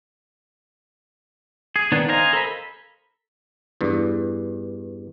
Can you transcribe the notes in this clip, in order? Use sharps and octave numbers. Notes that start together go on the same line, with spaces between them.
G#4
D#3 B3 D4
C5 D#5 F5 G#5 A#5
A4 A#4 B5
E2 G2